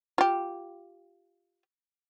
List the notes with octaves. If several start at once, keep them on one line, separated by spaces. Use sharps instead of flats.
F4 G4